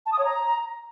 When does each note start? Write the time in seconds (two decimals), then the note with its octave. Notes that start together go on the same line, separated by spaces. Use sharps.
0.06 A5
0.12 D#6
0.19 C#5
0.25 A#5